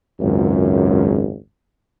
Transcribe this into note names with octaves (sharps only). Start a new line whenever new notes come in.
G#1 C#2 F#2